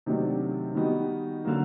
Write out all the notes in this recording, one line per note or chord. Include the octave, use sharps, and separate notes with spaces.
C3 D#3 F#3 A3 D4
D#3 G3 B3 D#4 F#4
D3 F#3 A#3